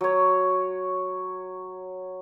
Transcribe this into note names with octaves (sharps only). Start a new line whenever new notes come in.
F#3 C#5